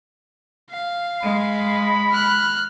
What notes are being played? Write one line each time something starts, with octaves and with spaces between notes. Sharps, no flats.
F5
G#3 B5
F6 F#6